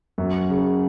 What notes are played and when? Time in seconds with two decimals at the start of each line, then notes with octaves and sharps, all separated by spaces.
0.18 F#2
0.50 C#3